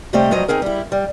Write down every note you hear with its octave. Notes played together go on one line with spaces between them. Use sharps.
C3 G3 A3 C4 G4 D#5
G2 F3 F#3 D#5 A#5
C4 D#4 G#4 A#4
G3 E4
G3